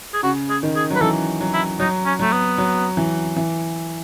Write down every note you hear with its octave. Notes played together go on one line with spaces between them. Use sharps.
G#4
C#3 F#4
G#4
D#3
G#4
F#3
B4
E3 A4
F#3
E4
F#3 D#4
C#4
F#3 A3
B3
F#3
E3
E3